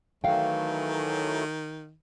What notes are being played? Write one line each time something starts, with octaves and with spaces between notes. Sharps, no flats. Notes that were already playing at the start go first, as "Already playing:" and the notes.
D#3 E3 F#3 A3 F5 G5